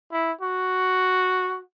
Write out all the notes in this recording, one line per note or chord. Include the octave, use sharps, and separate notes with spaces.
E4
F#4